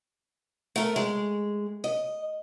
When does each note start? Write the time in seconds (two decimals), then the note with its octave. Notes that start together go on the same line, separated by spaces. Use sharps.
0.76 A3 A#4
0.96 G#3
1.84 D#5